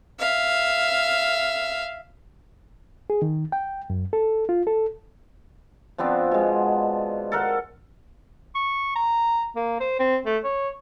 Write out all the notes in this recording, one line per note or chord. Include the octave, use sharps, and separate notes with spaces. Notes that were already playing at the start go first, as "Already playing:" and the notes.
E5 F5
G#4
D#3
G5
F#2
A4
F4
A4
F3 B3 C4 D4
B2 G#3
A4 A#4 F#5
C#6
A#5
A#3
C5
C4
A3
C#5